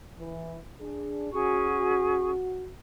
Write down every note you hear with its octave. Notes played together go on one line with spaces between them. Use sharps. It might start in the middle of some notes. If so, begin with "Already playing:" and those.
E3
D4 G#4
C#4 F#4 G#4 C#6